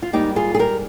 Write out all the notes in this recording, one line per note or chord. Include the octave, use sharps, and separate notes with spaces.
F4
G#2 G3 A#3 D#4 G4
F4 G#4
G#4
G4 A#4